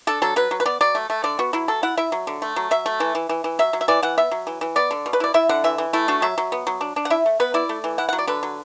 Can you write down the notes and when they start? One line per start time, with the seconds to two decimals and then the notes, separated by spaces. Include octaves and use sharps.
0.07 D4 A4
0.22 F#3 A4
0.36 F#3 B4
0.51 F#3
0.60 B4
0.66 B3 D5
0.81 F#3 D5
0.95 A3
1.10 A3
1.24 D3 D5
1.39 B3 F#4
1.53 F#3 E4
1.68 F#3 A4
1.83 E4 F#5
1.97 E4 E5
2.12 F#3
2.27 D3
2.42 A3
2.56 F#3
2.71 F#3 E5
2.86 A3
3.00 E3
3.15 E3
3.29 E3
3.44 E3
3.59 F#3 E5
3.73 F#3
3.81 E5
3.88 E3 D5
4.03 E3 F#5
4.18 B3 E5
4.31 F#3
4.47 E3
4.61 E3
4.76 B3 D5
4.91 D3
5.06 B2
5.13 B4
5.20 E4 D5
5.34 E4 E5
5.49 D3 F#5
5.64 E3 E5
5.78 E3
5.93 A3 E4
6.08 D4 F#4
6.22 F#3 E5
6.38 F#3
6.52 B3
6.67 F#3
6.81 D4
6.96 D4
7.05 F#5
7.10 E4 E5
7.26 A3
7.40 B3 B4
7.54 E4 D5
7.69 A3
7.84 E3
7.98 E4 F#5
8.09 F#3 F#5
8.19 D5
8.27 D3 B4
8.43 F#3